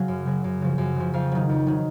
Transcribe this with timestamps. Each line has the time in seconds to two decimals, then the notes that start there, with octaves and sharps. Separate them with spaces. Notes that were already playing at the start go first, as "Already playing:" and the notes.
Already playing: C#3 F#3 F5 G#5
0.08 F#2
0.26 C#3 F#3
0.44 F#2
0.61 C#3 F3
0.78 F#2
0.96 C#3 F3
1.13 F2 F5
1.31 D#3 F#3
1.49 F2
1.67 D#3 F#3